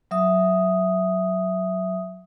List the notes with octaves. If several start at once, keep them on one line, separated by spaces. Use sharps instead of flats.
F#3 E5 D#6